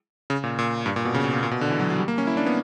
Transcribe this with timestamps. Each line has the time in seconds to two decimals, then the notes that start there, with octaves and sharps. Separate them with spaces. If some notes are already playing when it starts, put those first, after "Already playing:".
0.30 C#3
0.44 A#2
0.59 A#2
0.86 G2
0.96 A#2
1.05 B2
1.14 C#3
1.24 B2
1.33 A#2
1.43 A#2
1.51 B2
1.61 D3
1.70 E3
1.80 F#3
1.90 F#3
1.99 G3
2.08 A#3
2.18 C#4
2.27 E4
2.37 D4
2.46 B3